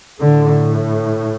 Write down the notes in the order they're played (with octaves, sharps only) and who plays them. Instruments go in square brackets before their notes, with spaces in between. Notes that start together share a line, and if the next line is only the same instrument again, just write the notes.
[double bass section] A2 D3